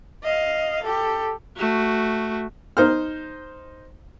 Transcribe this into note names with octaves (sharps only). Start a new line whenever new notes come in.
D#5 F5
G4 A4
A3 F#4
D#4 C5 F6